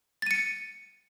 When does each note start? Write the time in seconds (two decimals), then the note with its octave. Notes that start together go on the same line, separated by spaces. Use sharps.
0.22 A6
0.26 D#7
0.31 C#7